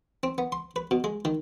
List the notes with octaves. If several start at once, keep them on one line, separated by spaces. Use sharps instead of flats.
C4
B3
C6
B4
B2
G#3
D#3